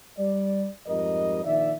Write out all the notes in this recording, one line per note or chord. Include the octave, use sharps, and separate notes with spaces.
G3 D5
F2 G#2 G3 A#4 D#5
A#1 D#3 D5 E5